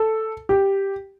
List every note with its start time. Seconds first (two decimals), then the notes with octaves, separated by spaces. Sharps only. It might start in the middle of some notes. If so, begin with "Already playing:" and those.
Already playing: A4
0.49 G4